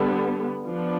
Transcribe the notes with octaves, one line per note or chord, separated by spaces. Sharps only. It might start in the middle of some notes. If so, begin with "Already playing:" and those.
Already playing: D3 G3 B3
F3 B3 D4